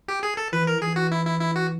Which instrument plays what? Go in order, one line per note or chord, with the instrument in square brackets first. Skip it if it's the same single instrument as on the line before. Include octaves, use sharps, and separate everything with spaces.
[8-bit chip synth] G4
G#4
A4
[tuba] E3 [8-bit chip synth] B4
[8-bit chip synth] A#4
[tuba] E3 [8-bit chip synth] G#4
[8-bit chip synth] F#4
E4
E4
E4
F#4